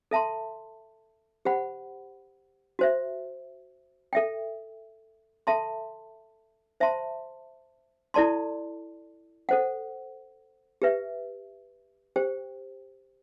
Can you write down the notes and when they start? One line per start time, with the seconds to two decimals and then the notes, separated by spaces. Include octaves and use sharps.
0.11 A4 E5 A5 C6
1.45 G4 C5 F#5 B5
2.79 F#4 C5 E5
4.13 A4 E5 G5
5.47 A4 E5 A5 C6
6.80 C5 E5 A5 C6
8.14 E4 A4 D5 A5 C6
9.49 A4 C5 F#5
10.82 G4 B4 E5
12.16 G4 C5 G5